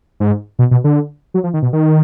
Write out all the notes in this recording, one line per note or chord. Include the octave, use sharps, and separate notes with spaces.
G#2
B2
B2
D3
F#3
F3
D#3
B2
D#3